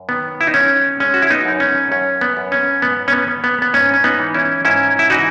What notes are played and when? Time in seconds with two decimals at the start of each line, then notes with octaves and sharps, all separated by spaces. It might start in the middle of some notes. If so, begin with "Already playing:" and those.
Already playing: F#2
0.09 D#3 B3
0.41 E4
0.47 D#4
0.54 F#2 C#4
1.00 G#3 C#4
1.14 F#4
1.22 E4
1.30 B3 D#4
1.45 F#2
1.60 C#4
1.91 F#2 C#4
2.21 B3
2.37 F#2
2.52 C#4
2.82 G#2 B3
3.08 C#4
3.13 B3
3.28 B3
3.44 B3
3.62 B3
3.74 G#2 C#4
3.94 C#4
4.04 B3 D#4
4.19 E3
4.34 C#4 E4
4.65 G#2 C#4 E4
4.99 E4
5.10 E3 D#4 F#4